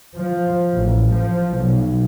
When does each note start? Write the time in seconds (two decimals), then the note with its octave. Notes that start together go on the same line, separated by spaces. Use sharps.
0.18 F3
0.75 A1
1.14 F3
1.58 B1